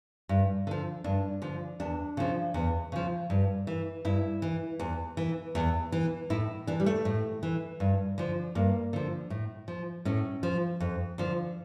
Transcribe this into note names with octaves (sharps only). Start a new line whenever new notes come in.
G2
D3 F3
G2 D4
D3 F3
E2 D4
C#3 F3
E2
C#3 F3
G2
E3
G2 E4
E3
E2
E3
E2
E3
A2 E4
E3 D4
G3
A3
A2
E3
G2
D3 F3
G2 A#3
D3 F3
A2
F3
A2 C#4
F3
F2
D3 F3